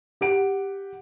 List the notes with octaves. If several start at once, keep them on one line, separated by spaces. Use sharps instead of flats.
G4 F#5 D7